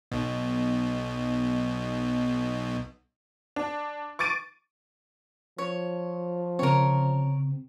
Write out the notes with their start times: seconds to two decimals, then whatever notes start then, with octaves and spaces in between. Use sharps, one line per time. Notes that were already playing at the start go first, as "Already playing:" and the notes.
0.12 B1 B2
3.56 D4
4.19 C#6 D6 A6 D7 D#7
5.58 F3 C#5
6.59 C#3 C4 A#4 C#5